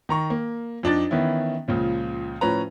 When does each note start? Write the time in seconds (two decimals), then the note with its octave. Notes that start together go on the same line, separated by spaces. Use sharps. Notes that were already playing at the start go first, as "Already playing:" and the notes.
0.09 D#3 A#5 C#6
0.30 A#3
0.83 F2 D4 D#4 A6
1.11 D#3 E3 B3 C#4 E4
1.68 C#2 A#2 C#3 F3
2.41 A2 F3 C#4 B4 A#5